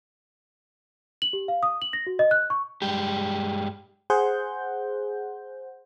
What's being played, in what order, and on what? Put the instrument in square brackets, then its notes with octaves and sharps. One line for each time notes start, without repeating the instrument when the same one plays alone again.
[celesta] F#7
G4
F5
D#6
F#7
A#6
F#4
D#5
F#6
C#6
[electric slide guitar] G2 G#3 G4
[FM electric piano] G#4 C5 F#5 G6